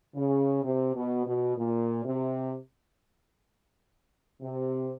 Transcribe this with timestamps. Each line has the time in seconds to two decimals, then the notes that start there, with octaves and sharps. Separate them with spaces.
0.15 C#3
0.63 C3
0.94 B2
1.26 B2
1.57 A#2
2.05 C3
4.41 C3